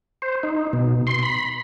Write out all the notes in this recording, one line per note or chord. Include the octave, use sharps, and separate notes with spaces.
C5
D#4
B2
C6
B5